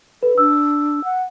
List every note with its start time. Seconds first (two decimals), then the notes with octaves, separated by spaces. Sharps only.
0.23 A4 B4
0.38 D4 E6
1.04 F#5